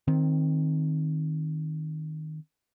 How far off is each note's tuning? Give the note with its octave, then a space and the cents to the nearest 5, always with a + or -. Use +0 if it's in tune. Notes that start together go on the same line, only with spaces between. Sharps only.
D#3 +0 C4 +15